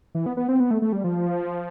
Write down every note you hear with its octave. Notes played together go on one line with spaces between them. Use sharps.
E3
B3
B3
C4
B3
A3
A3
G3
F3